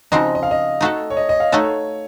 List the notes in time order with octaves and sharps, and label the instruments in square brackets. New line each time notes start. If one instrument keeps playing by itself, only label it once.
[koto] C#3 F3 C4 D#4 F#4 [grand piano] D#5
[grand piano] D#5
F5
D#5
[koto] A3 D#4 F#4 A4
[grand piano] C#5
D#5
D#5
F5
[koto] A3 D#4 F#4 A4 [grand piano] C#5